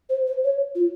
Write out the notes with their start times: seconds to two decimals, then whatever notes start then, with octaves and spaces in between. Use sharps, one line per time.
0.09 C5
0.27 C5
0.44 C#5
0.75 F4